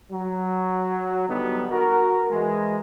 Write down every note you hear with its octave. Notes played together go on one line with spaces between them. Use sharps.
F#3
D3 F#3 G3 B3 D#4
F#4 A#4
E3 G#3